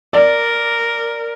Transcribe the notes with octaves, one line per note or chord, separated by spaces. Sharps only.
A#4 D5